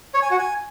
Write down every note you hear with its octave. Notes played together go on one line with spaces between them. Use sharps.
C#5
G#5
F#4
G#5